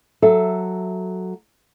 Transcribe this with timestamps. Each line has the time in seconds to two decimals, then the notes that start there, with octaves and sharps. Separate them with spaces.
0.22 F#3 A4 E5